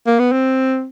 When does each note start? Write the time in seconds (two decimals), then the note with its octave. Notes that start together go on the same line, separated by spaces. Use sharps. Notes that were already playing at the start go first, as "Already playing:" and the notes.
0.07 A#3
0.19 B3
0.32 C4